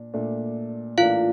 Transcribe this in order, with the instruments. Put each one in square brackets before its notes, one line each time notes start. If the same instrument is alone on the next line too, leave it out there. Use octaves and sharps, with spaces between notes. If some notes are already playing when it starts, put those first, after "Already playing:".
Already playing: [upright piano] A#2 D4
A#2 A3 D4
[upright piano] A2 E3 A#3 D4 [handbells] F4 F5